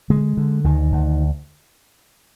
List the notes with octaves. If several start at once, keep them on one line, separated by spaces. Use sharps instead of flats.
D3 G#3
D3
D2 D#3
D2